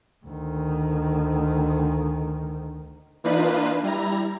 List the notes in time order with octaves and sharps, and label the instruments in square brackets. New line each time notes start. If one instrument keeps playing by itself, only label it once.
[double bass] D2 D#3
[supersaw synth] E3 A#3 D4 D#4 F4 B4
G3 E4 A#5